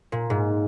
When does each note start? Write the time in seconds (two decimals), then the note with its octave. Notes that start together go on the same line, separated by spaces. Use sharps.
0.12 A#2
0.30 G#2